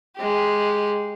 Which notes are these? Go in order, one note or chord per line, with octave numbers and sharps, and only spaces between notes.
G#3 G4